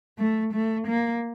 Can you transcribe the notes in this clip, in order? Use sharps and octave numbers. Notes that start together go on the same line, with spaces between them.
A3
A3
A#3